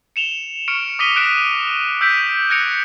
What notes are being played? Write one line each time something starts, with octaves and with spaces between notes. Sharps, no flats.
C#7 E7 F7 G7
C#6 F6 C#7 D7
D6 D#6 A#6 B6 D#7 G7
F#6 A#6 B6 D7 E7
E6 G6 B6 D7
F#6 G#6 A#6 C#7 D7 F7